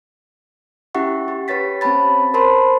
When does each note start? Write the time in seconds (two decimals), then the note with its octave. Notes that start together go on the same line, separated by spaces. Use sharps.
0.95 C#4 E4 G4 E5 F#5 C#6
1.28 G4
1.48 G4 B4 C#5 A6 B6
1.81 C4 C#4 C#5 A5 B5 A6
2.34 A#4 C5 A5 B5 C6